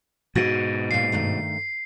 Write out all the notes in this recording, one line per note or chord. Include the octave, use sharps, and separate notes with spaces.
G#2 B2 F#4 F#5
A#2 A#3 C7
G2 D#3 A3